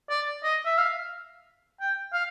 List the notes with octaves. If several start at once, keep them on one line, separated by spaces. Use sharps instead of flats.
D5
D#5
E5
F5
G5
F5